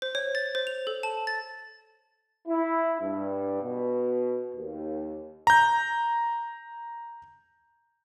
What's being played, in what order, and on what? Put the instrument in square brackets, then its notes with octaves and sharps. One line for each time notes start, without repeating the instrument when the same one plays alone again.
[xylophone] C5
C#5
A6
C5
F7
A4
A5
A6
[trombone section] E4
G2
B2
D#2
[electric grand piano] A#5 G6